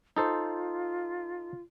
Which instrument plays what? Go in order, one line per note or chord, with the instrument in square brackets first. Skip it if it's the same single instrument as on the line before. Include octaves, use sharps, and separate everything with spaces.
[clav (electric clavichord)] D#4 A4 C5 [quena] F4